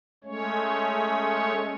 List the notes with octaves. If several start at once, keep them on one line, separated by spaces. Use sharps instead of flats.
G#3 A3 C#4 C#5